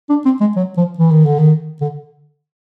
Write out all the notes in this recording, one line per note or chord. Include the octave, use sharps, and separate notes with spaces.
D4
C4
G#3
F#3
F3
E3
D#3
D3
D#3
D3